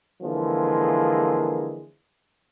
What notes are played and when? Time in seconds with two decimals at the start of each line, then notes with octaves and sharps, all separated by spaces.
0.23 D3 E3 F3 G#3 A#3